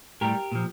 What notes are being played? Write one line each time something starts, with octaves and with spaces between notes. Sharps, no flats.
A2 G3 G4 A#4
A#2 F3